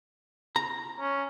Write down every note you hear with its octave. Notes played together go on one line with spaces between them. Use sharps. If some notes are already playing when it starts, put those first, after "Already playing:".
A#5
C#4